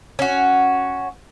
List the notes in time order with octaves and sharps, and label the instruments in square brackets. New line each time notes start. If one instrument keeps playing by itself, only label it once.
[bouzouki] C#4 F#4